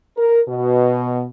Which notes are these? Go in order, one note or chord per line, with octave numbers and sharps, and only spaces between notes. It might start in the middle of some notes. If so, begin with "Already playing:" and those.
A#4
B2